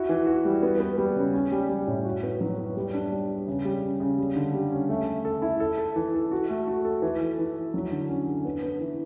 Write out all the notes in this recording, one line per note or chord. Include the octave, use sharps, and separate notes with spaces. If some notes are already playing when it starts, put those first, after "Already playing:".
Already playing: E4 F#4
E3
F#4
G3
B3
B3
G3
C#3
C#4
G3
G3
A2
F#4
B3
F#3
B3
G3
D4
G3
G4
C#3
G3
C#3
C#3
G3
D3
G3
C#4
A3
A3
A4
E4
A4
A4
E3
A4
F#4
A3
F#4
A4
E3
E3
E3
E3
F#3
D3
C#4
D3
B3
B3
E3